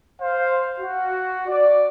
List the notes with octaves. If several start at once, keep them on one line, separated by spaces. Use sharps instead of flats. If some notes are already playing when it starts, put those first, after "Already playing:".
C5 F5
F#4
D5